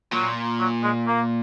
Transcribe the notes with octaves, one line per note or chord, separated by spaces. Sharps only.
A#2 F#3
F#3
G#3
A#3